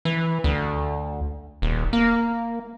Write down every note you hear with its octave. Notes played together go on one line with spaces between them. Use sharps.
E3
D2
D#1
A#3